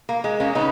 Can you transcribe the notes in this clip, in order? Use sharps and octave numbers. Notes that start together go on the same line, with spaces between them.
A#3
G#3
A#3 C#4
C#3 B3 D#4